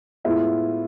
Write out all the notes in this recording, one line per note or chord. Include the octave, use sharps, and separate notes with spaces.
A2 G#3 B3 E4 F4